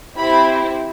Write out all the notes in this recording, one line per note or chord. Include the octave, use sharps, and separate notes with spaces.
C4 E4 G4 B5